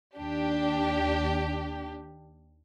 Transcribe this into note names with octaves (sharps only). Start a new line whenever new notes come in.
D#2 D4 G4